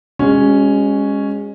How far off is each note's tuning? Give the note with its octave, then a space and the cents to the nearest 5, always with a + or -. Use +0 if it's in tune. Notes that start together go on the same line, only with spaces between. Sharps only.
G#3 -25 C#4 +0 F#4 +0